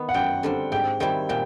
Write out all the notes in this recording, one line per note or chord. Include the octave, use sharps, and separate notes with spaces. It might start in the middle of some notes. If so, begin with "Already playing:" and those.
Already playing: D#3 B3
F#5
F#2 G5
D3 G3 C4
G#2 G5
D#3 G3 C4 E4 G5
A#2 G5